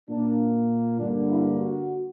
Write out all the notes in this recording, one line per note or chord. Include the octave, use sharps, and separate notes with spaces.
A#2 A#3 D4
G2 D3 A#3 D4
E4
F#4